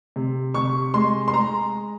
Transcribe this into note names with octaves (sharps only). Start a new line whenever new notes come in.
C3
C3 C#6
G#3 C6
C6
G#3 A#5